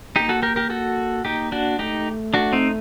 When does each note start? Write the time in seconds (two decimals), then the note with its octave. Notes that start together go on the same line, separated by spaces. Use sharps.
0.16 A#3 D#4 G4
0.29 F#4 A4
0.42 G4 A#4
0.56 G4 A#4
0.70 F#4 A4
1.25 A#3 D#4 G4
1.52 D4 F#4
1.79 A3 D#4 G4
2.34 D4 F#4
2.53 C4 D#4